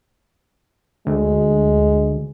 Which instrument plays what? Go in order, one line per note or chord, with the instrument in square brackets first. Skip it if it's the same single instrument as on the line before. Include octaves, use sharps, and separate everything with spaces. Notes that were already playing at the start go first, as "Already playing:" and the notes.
[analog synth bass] D2 [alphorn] G#3